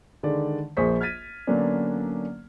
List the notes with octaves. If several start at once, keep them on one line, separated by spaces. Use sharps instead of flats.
D3 D#3 G#3 D5
A#1 A#3 G#4 C5 C#6 B6
F6 G#6 A6 B6 D#7
D3 F#3 A#3 B3 C#4 D4